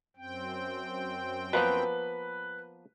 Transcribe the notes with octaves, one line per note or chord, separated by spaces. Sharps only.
F#2 C4 G5
F3 A#3 B3 B4